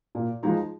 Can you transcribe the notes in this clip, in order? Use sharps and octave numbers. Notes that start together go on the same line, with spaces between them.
A#2
F3 G#3 D#4 G#4